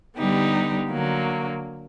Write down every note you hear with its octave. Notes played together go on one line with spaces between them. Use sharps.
D3 G3 B3 D#4 G4
D3 F#3 A#3